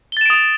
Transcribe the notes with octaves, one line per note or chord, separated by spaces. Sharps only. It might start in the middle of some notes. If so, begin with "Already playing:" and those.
D#6 A6 D7 E7 G7